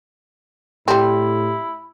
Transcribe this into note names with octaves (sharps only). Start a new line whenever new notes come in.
A2 G3 C4 E4 G4